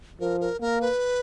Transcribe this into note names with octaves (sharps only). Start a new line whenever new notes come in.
F3 A#4
A#4
A#3 A#4
B4